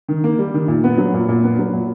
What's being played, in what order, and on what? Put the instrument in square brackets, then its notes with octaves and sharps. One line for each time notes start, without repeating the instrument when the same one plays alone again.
[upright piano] D#3
A#3
G3
D#3
A#2
B3
F#3
A#2
A#2
B3
F#3
A#2